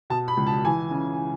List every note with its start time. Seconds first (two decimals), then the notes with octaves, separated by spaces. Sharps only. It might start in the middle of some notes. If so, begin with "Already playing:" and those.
0.10 B2 A5
0.28 B5
0.37 C#2
0.47 A5
0.65 E3 G#5
0.91 C#3